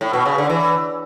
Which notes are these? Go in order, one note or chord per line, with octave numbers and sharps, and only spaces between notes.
A2
B2
C#3
D3
E3